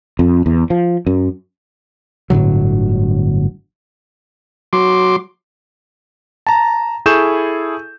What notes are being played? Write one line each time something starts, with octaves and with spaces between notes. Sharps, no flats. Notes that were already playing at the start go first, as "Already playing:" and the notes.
F2
E2
F3
F#2
G1 A2 D3 F#3
F#3 C6 D6
A5 A#5
E4 G#4 A4 C#6 G6 E7